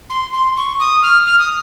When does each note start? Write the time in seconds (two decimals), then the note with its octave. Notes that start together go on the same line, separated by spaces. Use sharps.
0.10 C6
0.33 C6
0.57 C#6
0.80 D#6
1.02 F6
1.26 F6
1.39 D#6